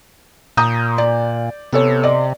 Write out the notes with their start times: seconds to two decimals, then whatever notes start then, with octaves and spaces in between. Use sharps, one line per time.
0.57 A#2 A#5 D#6 G6
0.98 D5
1.73 C3 B3 A4 C#5
2.03 D5 D#5